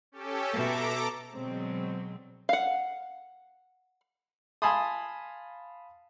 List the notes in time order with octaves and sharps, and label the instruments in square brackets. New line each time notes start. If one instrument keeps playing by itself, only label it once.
[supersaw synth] C#4 G4 A4
[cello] B2 E5 [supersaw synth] A4 A#5 D6
[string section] B2 D3 F#3 G#3 C4
[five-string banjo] F5 F#5
[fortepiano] F5 G#5 A5 B5 C6 D#6